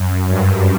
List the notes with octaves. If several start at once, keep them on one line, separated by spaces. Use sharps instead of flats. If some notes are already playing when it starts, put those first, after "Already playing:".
Already playing: F#2
G2